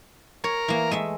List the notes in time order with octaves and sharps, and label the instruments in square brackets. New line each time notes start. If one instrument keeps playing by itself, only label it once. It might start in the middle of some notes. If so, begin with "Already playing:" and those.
[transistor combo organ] A#4 [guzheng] C#5
[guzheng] E3 A#3
G#3 A3 E5